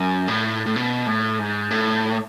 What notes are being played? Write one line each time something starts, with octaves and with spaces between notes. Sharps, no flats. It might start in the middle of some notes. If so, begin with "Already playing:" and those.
Already playing: F#2
A2
A2
B2
A2
G#2
A2